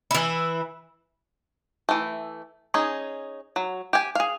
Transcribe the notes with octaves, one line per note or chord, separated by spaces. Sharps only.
E3 E4
E3 A3
C#4 D#4 G#4
F#3
G4 G#5
G#4 F5